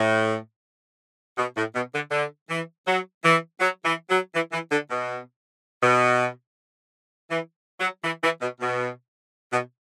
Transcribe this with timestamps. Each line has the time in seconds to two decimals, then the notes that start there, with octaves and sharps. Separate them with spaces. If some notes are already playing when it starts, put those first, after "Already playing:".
Already playing: A2
1.38 B2
1.57 A2
1.75 B2
1.94 D3
2.11 D3
2.50 E3
2.87 F#3
3.24 E3
3.60 F#3
3.84 E3
4.10 F#3
4.35 E3
4.52 E3
4.71 D3
4.90 B2
5.82 B2
7.31 E3
7.80 F#3
8.04 E3
8.23 E3
8.41 B2
8.60 B2
9.52 B2